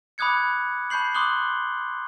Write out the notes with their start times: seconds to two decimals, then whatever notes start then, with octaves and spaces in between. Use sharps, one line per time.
0.18 B5 D6 D#6 F#6 G#6 C#7
0.90 A5 B5 C#6 G6 C7 F#7
1.15 C6 D6 D#6 F#6 F#7 G7